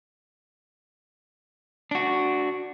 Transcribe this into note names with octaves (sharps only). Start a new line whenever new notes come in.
D4 F#4